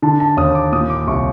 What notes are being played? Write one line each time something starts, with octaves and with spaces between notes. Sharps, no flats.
D3 A5
A5
D#2 D#6
D6
A#2 D#6
D6
C2 C#6